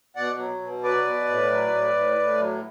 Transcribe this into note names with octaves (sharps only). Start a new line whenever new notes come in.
B2 D5 F#5
F#3
B2
F#3 B4 D5
B2
A2
F#3
A2
A2
A2
F#3